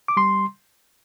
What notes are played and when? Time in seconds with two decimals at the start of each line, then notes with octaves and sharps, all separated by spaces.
0.08 D6
0.17 G3 C6